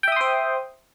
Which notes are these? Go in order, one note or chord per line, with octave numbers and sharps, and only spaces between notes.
C5 E5 G5 C6 D#6